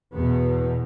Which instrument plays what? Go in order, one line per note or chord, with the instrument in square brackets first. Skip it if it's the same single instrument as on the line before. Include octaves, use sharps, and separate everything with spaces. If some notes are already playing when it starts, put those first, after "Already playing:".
[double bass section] E2 B2 B3